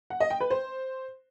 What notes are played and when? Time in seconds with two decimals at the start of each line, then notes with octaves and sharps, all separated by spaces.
0.10 F#5
0.20 D#5
0.30 G5
0.40 B4
0.50 C5